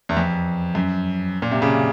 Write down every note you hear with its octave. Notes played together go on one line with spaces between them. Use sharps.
E2
F2
F#2
A#2
C3
C#3